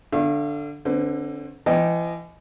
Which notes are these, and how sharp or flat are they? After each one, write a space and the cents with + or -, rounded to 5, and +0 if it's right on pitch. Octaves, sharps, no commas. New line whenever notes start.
D3 +0 F5 -40 C#6 -40
D3 +0 C4 +40 B4 +40
E3 +40 D#5 +0 G5 +0